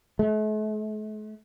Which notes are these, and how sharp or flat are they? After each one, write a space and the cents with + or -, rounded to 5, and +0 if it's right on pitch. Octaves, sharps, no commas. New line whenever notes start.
A3 -45